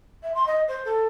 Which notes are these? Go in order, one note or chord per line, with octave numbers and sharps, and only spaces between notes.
E5
C6
D#5
C5
A4